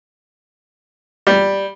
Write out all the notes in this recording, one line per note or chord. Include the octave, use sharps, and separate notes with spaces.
G3